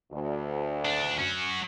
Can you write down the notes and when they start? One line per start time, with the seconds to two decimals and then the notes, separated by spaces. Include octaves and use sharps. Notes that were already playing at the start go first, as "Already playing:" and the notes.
0.12 D2
0.85 D#2 D4
1.18 C#4 F#4